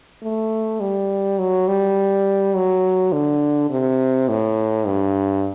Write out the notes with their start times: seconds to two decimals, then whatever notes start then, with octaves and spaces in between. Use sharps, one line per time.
0.23 A3
0.81 G3
1.39 F#3
1.68 G3
2.55 F#3
3.12 D3
3.70 C3
4.29 A2
4.87 G2